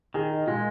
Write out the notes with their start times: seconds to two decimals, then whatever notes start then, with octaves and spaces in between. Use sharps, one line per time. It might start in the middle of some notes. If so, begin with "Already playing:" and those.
0.14 D#3 G#4
0.31 D#4
0.47 A#2 G#3